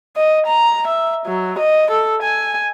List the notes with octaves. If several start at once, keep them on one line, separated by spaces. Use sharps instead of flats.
D#5
A#5
E5
F#3
D#5
A4
G#5